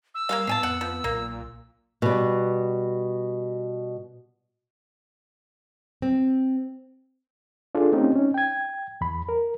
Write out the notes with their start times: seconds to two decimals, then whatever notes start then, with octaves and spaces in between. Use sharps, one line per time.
0.15 E6
0.29 G3 A#3 C4 F5
0.47 A2 B3 F5 G#5 A5
0.63 F2 F#5
0.81 F3
1.04 B1 A#2 A#3
2.02 B2 G3
6.02 C4
7.75 D4 F4 G#4 A4
7.92 A3 C4 C#4 D#4 G4
8.16 C#4 D#4
8.34 G5 G#6
9.01 E2 B5
9.29 A#4